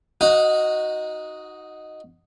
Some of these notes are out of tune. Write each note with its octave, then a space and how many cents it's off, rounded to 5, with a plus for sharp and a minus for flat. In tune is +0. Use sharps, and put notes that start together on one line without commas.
D#4 +0 F#4 +0 F#5 -35